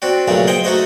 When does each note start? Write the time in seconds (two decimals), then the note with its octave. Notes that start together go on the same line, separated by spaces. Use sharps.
0.02 C4 D4 F#4
0.28 B1 A#2 C#3 A3 F#4
0.47 G#4 C5 D#5 G5
0.64 A3 D#4 F#4 C5 D#5